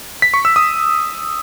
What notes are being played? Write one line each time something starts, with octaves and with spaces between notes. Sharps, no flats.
B6
C#6
E6
D#6